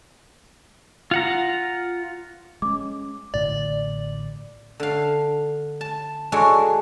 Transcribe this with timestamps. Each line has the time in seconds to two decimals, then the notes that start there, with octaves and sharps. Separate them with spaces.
1.11 F4 F#5 A#5
2.62 G#3 C#4 D6
3.34 A1 A2 D3 D5
4.80 D3 F5
5.81 A5
6.32 G#3 D4 F#4 A4 C#5 D5